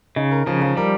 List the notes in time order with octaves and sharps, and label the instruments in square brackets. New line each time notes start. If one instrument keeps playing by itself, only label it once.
[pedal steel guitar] C#3 [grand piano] D#4
[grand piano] A#4
[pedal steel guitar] C#3 [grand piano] F3
[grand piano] F3
[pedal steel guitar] G3 [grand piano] A#4